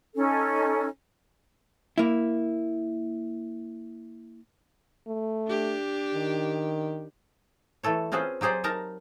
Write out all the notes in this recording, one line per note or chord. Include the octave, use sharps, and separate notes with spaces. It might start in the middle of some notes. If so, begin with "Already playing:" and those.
C#4 D#4 A4
A#3 E4
A3
D4 G4
D#3
E3 A3 A4 C#5
C4 C#4 F4 G#4 B4 C5
F#3 G4 G#4 C5 D5
D#4 A#4 A5 A#5